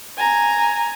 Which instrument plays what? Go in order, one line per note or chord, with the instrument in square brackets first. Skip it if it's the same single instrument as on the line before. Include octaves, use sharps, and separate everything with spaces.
[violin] G#5 A#5